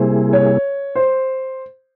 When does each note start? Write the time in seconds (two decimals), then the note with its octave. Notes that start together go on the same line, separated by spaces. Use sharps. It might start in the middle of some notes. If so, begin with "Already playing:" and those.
Already playing: C3 G3 A#3 E4 G#4 C5
0.33 C#5
0.95 C5